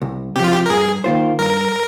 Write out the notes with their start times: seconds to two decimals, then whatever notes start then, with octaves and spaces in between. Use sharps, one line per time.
0.02 C2
0.36 C3 F3 G4
0.44 F4
0.53 G4
0.66 A#4
0.70 G2 G#4
1.04 D#3 A#3 F4 C5
1.39 G2 A#4